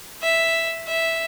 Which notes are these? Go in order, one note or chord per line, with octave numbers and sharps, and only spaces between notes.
E5
E5